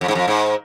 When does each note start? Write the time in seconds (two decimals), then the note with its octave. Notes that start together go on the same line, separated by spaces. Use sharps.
0.01 F2
0.08 G#2
0.15 F2
0.28 G#2